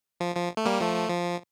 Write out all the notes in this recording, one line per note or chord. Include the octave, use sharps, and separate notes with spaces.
F3
F3
A3
G3 A#3
F3 A3
F3